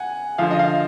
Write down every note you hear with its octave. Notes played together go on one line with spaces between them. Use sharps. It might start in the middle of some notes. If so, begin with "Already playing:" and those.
Already playing: F#5 G#5
D3 F3 F5
D#5
F5